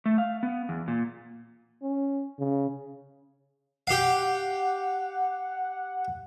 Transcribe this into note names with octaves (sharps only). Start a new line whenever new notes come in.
A3
F5
B3
E2
A#2
C#4
C#3
G4 F5 F#5